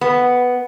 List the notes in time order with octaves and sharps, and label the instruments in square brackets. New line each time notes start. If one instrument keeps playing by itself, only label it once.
[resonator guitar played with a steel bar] B3